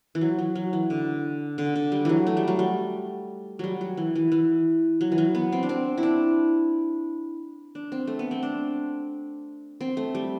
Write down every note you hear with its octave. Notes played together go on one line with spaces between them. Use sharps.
E3
F#3
F#3
F#3
E3
D3
D3
D3
G3
E3 F#3
A3
G3
F#3
G3
F#3 G3
F#3
E3
E3
E3
F#3
E3
F#3
B3
C4
D4
C4
E4
D4
D4
C4
A3
B3
C4
D4
C4
A3
G3